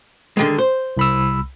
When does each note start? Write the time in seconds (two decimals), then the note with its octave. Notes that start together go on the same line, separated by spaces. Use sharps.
0.37 D3 D#3 G#3
0.58 C5
0.97 C2 B5 E6